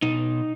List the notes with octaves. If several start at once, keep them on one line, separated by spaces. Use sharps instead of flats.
B2 D#4